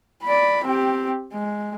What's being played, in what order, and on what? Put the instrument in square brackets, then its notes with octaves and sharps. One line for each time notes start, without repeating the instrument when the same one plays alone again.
[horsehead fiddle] D5 B5
C4 G4
G#3